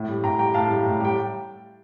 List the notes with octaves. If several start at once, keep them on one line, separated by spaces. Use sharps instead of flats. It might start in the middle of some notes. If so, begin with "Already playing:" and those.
Already playing: A2
G3
A2 G5 A#5
G3 G5 A#5
A2 F5 A5
G3
A2
G3 G5